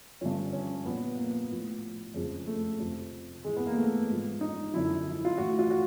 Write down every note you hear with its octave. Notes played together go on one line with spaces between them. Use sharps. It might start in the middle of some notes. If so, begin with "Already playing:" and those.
G2 D3 F3 C#4
C#4
A#2 F3 B3
A#3
A2 F3
F2 C#3 F3 G#3
A3
F2 C3 F3
G#2 E3 G#3
B3
A#3
A3
G#2 F3
D#4
F#2 D3 F3 E4
E4
F4
A2 E3 F#4
F4
F#4